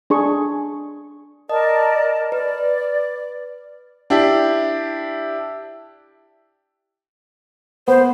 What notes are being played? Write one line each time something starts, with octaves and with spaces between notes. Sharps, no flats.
D4 G#4 C#6
A#4 D5 D#5 A5
B4 D5
D4 E4 G4
B3 C5